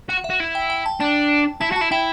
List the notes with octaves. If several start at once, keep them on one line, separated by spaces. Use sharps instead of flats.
F#4 F#5
E5
F#4
E4
G5
G5
A5
D4 A5
E4 A5
F#4 A5
E4
E4 G5